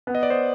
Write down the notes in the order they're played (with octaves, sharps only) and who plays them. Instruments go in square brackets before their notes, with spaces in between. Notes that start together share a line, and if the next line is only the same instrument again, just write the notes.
[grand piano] B3
[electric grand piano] D#5
D5
C5 D#5